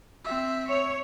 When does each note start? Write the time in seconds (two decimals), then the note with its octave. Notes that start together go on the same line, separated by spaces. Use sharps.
0.25 C4 E5
0.68 C#5